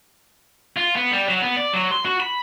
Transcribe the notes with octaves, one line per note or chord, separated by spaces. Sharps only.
F4
B3
G3
F#3
B3
D5
F#3
C6
F#4
B5